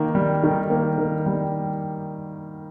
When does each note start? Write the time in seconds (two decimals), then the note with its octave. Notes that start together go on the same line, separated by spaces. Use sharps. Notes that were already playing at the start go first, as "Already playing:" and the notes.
Already playing: D#3 A#3
0.15 G3
0.44 D#3
0.70 A#3
0.98 D#3
1.26 G3